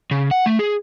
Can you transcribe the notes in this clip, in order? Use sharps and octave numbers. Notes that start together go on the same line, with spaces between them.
C#3
F#5
A3
G#4